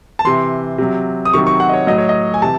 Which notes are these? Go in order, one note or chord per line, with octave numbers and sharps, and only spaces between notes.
A5
C3 E3 C6
C3 F#3
D#6
C3 D#3 F#3 C#6
C#6
F#5
D#5
C#5
A2 F#3 D#5
C#5
D#5
G#5
C3 E3 A5